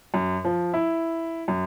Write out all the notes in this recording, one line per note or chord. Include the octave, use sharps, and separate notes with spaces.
F#2
F3
E4
F#2